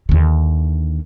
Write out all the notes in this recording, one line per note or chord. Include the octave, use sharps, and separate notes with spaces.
D#2 D3